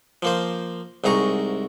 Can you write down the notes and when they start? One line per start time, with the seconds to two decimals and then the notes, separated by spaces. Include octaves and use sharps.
0.22 F3 A#3 C5
1.04 C2 G#2 G#4 A#5 C#6